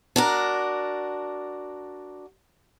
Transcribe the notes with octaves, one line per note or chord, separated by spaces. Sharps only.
D4 F#4 A#4